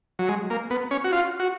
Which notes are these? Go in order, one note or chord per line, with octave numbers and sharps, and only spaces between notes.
F#3
G#3
A#3
B3
C#4
F#4
F4
F#4